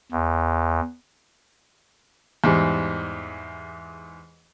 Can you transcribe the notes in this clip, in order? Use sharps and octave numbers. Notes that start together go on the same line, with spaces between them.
E2
E2 G#2 G3